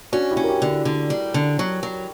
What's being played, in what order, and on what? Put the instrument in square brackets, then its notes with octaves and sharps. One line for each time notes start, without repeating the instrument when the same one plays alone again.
[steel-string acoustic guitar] C#4 [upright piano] D4 F#4
[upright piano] E4 G4
[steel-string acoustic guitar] C#4
[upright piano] A#4
E4 G4
[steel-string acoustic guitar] D3
[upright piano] E4
[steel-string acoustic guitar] D3
G3
D3
F#3
F#3